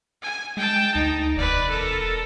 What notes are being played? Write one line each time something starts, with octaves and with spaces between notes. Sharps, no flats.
G#5
G#3 G5 A5
D2 D#4
E1 B4 D5
A4 A#4